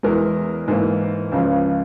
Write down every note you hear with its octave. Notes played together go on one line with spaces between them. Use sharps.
E2 E3 G#3 A#4
G#2 E3 A#3
C#2 C#3 F3